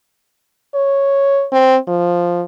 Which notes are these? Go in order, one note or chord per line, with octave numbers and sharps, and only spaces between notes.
C#5
C4
F3